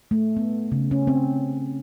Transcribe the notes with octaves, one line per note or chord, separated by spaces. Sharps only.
A3
B3
C#3
C#4
C4